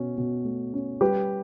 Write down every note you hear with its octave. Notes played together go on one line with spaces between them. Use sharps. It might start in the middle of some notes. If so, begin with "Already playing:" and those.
Already playing: B2 C#4
B2
A3
C#4
G3 G4 B4